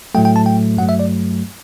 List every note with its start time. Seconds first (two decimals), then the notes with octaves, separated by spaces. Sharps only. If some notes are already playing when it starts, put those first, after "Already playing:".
0.15 A2 F#3 A3 G5
0.25 G5
0.36 A5
0.46 G5
0.77 G2 F#3 A3 F#5
0.89 E5
0.99 D5